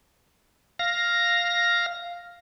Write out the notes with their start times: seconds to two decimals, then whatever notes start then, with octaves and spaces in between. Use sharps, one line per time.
0.79 F5 A#6